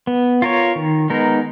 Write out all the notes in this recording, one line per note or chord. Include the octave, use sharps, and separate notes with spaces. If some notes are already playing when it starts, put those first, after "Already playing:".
B3
F4 A#4 C#5
D#3
G#3 B3 D#4 A#4